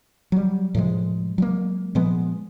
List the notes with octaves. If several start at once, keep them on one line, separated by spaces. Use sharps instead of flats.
F#3 G3
A2 C3 F3 G#3
F#3 G#3 A#3
A#2 F3 G#3 B3